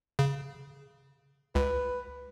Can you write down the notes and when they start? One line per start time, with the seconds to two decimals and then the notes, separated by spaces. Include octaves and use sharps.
0.19 C#3
1.55 C#2 B4